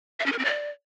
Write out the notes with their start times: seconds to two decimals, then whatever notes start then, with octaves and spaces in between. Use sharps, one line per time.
0.20 E5
0.26 C#4
0.32 A#4
0.39 C4
0.45 D5